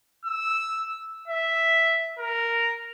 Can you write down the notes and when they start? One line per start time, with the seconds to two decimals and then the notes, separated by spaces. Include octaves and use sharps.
0.25 E6
1.28 E5
2.19 A#4